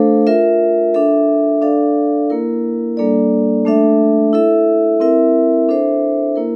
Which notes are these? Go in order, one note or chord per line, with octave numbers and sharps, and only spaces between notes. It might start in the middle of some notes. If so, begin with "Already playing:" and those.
Already playing: A3 D4 A4 C5 F5
F4 A#4 E5
D4 A4 E5
D4 A4 D5 F5
A#3 E4 A#4
G3 A#3 D4 A4 D5
A3 D4 A4 E5
E4 A4 E5
C4 E4 A#4 E5
D4 A4 C5 E5
A#3 E4 A#4